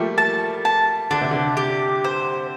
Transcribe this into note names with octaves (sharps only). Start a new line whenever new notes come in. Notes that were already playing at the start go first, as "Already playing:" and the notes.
Already playing: F3 G3 A3 A#3 G4
A5
A5
D3 D4
C3
D3
G4
C5